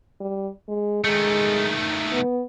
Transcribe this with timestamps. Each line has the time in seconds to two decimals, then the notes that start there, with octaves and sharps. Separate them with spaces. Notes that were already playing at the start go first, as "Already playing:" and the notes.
0.20 G3
0.68 G#3
1.04 D#3 G#3 A3
2.11 B3